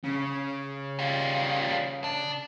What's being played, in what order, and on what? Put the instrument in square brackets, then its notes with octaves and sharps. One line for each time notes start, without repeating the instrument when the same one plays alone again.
[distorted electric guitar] C#3
[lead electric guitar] G3 F4
D4